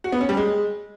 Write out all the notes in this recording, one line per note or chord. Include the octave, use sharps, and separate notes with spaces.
F#4
B3
C#4
G3
G#3